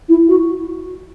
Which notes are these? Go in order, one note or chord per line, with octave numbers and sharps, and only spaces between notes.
E4
F#4